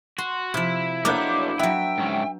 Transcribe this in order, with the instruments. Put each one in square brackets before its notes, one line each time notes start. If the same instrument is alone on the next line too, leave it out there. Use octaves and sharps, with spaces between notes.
[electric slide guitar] F#4 [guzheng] C6
[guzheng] C3 F3 [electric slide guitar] E4
[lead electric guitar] B1 C#5 [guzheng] A#3 B3 D4 [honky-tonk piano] D6 G6
[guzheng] F#3 B3 [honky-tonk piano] E5 [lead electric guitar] G5
[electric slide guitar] G#2 C#4